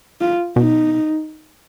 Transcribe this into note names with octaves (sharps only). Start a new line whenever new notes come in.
F4
B2 D#4